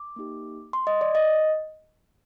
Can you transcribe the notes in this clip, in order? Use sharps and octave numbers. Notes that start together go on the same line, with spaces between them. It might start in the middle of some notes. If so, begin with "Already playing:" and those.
Already playing: D6
A#3 D#4 G4
C6
D#5
D5
D#5